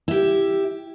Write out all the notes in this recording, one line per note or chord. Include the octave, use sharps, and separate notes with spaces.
E4 G4